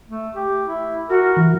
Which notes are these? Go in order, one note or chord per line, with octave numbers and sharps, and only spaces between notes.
A3
G4
E4
F#4 A#4
E3